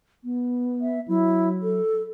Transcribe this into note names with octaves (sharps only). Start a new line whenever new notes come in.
B3
E5
F#3 E4
A4